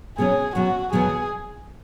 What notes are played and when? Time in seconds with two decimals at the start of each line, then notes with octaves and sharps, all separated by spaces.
0.17 B2 F#3 C#4 G#4
0.55 B2 F#3 C#4 F#4
0.93 E2 B2 F#3 G#4